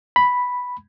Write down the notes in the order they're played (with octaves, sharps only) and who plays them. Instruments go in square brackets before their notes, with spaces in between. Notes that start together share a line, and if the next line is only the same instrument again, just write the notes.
[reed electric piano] B5